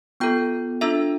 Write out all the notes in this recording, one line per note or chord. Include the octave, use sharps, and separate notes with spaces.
B3 F4 A4 G5 G6
D4 F4 A4 E5 E6